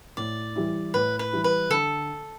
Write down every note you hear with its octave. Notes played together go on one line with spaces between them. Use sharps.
A2 D5
E3 G3 E4
A2 B4
B4
E3 G3 E4
B4
D3 A4